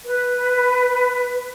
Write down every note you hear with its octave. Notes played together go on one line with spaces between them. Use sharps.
B4